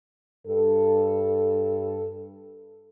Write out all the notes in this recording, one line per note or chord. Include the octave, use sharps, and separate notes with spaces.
G2 A4